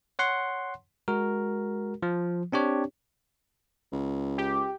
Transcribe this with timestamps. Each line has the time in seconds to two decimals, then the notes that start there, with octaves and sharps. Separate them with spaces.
0.19 C#5 F#5 C6
1.08 G#3 F#4 A#4
2.03 F3
2.52 C4 D4 G4 C#5
3.92 C#2
4.38 G4